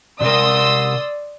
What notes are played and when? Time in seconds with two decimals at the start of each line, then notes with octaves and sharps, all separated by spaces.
0.21 C3 A#4 D5 C6 D#6 E6